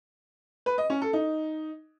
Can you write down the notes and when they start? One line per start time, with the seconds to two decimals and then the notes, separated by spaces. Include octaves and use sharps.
0.66 B4
0.78 D#5
0.90 C#4
1.02 A4
1.13 D#4